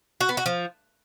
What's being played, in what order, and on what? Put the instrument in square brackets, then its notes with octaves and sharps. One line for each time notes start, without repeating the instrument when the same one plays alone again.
[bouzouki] F#4
B3
F#4
F3